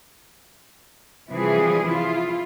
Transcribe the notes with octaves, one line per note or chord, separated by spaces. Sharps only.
C3 E3 F3 G3 G#4
E4 F4